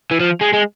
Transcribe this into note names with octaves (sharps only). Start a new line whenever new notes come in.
E3
F3
G#3
G#3